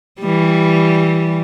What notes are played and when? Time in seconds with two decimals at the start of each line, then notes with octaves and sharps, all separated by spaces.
0.21 E3 G3